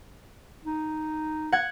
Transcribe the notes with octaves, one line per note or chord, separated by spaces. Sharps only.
D#4
F#5 G#6